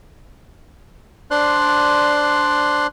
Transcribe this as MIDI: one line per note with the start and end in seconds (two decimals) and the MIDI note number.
1.31 2.87 62
1.31 2.87 72
1.31 2.87 74
1.31 2.87 84
1.31 2.87 90